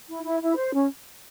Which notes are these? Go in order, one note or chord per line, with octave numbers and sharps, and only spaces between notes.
E4
E4
E4
C5
C#4